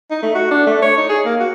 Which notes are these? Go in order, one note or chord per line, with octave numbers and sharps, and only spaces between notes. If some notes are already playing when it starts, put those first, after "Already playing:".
D#4
A3
F#4
D4
A3
C#5
D#4
G#4
A#3
F#4